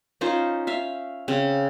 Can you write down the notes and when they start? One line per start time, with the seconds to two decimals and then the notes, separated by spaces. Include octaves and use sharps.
0.21 C#4 D#4 F4 C5
0.67 E5 F5
1.28 C#3 C4